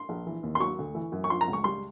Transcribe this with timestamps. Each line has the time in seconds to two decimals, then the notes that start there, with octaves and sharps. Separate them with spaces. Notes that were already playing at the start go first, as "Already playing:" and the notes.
Already playing: C6
0.09 A#1
0.27 E3
0.43 D#2
0.55 C6
0.60 F#3 C#6
0.79 D2
0.95 E3
1.12 F#2
1.24 C#6
1.30 F3 C6
1.41 A#5
1.48 C#2
1.53 C#6
1.64 G3 C6